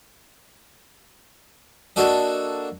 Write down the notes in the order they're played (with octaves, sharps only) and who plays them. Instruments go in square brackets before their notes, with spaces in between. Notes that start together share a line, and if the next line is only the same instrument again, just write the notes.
[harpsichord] A#3 D4 F#4 A4 D#5